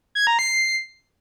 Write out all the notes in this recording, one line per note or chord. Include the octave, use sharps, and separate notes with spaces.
G#6
A#5
C7